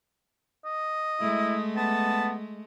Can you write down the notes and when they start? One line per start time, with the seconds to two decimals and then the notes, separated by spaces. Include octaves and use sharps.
0.65 D#5
1.21 G#3 A3 E4
1.77 B3 A5